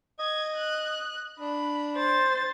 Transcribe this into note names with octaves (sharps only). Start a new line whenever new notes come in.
D#5 G#6
F#6
D4 B5
C5 A6